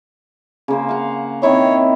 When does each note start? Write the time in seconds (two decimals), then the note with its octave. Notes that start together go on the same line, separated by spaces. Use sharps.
0.68 C#3 A#3 C5
0.89 F5 F#5
1.43 D#3 C4 E4 C#5